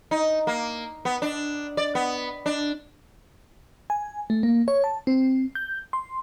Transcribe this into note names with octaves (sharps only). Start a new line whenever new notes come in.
D#4
A#3
B3
D4
D5
B3
D4
G#5
A3
A#3
C#5
A5
C4
G6
C6